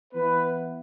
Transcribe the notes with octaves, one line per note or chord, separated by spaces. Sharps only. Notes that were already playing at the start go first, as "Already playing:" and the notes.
E3 B3 E4 B4